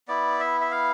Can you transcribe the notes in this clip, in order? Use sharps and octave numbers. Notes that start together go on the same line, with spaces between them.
B3 E4 D5
E5
E5
F5